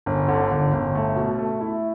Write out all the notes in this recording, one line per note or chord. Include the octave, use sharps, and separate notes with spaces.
G1
D3
G1
G1
A3
B2
A3
E4